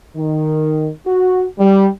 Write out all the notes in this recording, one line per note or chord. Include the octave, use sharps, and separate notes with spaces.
D#3
F#4
G3